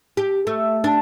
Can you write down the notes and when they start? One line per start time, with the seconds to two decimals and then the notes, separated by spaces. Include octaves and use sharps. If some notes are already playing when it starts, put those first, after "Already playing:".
0.17 G4
0.47 A3
0.84 D4